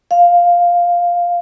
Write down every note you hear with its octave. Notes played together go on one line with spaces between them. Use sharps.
F5